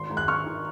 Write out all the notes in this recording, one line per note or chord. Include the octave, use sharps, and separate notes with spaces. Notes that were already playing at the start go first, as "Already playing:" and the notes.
Already playing: G#1 C6
G#2 D#3
F#6
G#1 C#6 F6
D#3